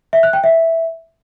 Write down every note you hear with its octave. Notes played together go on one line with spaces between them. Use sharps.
E5
F#6
G5
E5